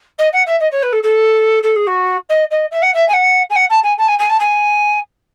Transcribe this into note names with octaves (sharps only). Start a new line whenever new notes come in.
D#5
F#5
E5
D#5
C#5
B4
A4
A4
A4
G#4
F#4
D#5
D#5
E5
F#5
E5
G#5
F#5
G#5
F#5
A5
G#5
A5
G#5
G#5
A5
G#5